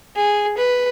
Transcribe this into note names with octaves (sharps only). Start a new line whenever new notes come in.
G#4
B4